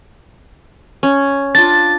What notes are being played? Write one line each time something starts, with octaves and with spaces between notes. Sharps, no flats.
C#4
D4 F4 A6